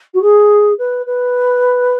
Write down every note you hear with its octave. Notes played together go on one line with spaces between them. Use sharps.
F#4
G#4
B4
B4